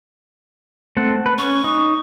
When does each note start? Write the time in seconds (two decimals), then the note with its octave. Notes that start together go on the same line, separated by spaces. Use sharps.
0.97 A3 C4 F#5
1.26 B4
1.38 C#4 C#6
1.64 D#4